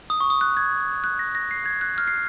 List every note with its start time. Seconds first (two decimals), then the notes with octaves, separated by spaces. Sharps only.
0.10 D#6
0.20 C#6
0.30 D#6
0.41 F#6
0.57 G#6
1.04 F#6
1.19 A#6
1.35 A#6
1.51 C7
1.66 G#6
1.81 F#6
1.98 F6
2.08 C7